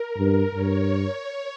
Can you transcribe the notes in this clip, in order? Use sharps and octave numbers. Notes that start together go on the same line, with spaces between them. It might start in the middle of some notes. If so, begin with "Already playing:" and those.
Already playing: A#4
G2
G2 C#5